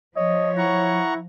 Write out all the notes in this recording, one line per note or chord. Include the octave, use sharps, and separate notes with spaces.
F3 C#5 D#5
E4 F#5 A#5 C#6